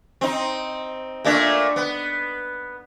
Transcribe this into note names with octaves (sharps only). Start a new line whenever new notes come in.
C4 D#4
A#2 A3 D4
B3